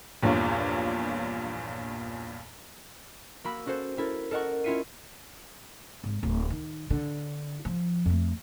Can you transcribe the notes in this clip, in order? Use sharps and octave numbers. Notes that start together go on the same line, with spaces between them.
A#1 E2 G2 A#2 C#5
A#3 F#4 B5 E6
C#4 F#4 A4 C5
C#4 E4 A4 A#4
A4 A#4 D#5 F#5 C#6
C#4 E4 F4 E5 C#7 D#7
G#1
D1
D#3
D3
F3
F2 A3